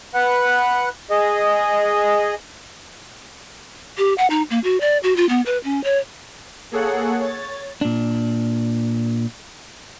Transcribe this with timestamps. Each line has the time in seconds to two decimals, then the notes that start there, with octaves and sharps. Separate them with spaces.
0.14 B4 F#5 F#6
1.10 G#4 D#5
3.98 G4
4.18 F#5
4.30 D#4
4.50 A#3
4.64 F#4
4.81 D5
5.03 F#4
5.17 F4
5.29 B3
5.46 B4
5.64 C#4
5.84 C#5
6.72 A#3 G#4 A4 C#5 F#5
7.21 C#5 A6
7.81 A#2 D4